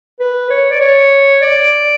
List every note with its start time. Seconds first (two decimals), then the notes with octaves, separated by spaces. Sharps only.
0.20 B4
0.50 C#5
0.71 D5
0.80 C#5
1.42 D5